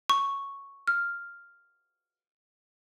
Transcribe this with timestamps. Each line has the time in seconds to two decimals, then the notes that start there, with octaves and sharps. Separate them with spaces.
0.09 C#6
0.88 F6